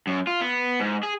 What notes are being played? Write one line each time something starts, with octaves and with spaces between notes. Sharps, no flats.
F#2
F4
B3
G#2
G#4